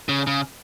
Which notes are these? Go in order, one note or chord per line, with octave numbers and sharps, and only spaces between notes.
C#3
C#3